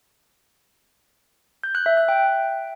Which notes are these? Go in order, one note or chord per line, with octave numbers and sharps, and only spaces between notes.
G6
F#6
E5
F#6
G5